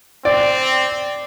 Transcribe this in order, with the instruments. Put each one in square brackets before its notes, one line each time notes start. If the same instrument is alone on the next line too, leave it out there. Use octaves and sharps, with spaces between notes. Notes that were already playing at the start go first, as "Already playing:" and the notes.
[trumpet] C4 [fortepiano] D5